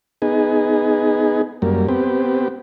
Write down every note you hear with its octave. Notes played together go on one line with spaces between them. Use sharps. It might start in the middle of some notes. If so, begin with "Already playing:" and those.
B3 D#4 G#4
F#2 G3 A#3
B3 C4 G4